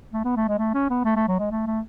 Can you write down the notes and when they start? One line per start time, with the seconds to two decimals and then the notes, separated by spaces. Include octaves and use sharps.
0.13 A3
0.25 B3
0.37 A3
0.48 G#3
0.59 A3
0.74 C#4
0.90 B3
1.05 A3
1.17 A3
1.28 F#3
1.39 G#3
1.51 A3
1.67 A3